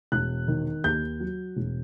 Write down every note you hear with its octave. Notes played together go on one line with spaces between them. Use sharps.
E1 F#6
D#3
D#2 G6
F#3
E1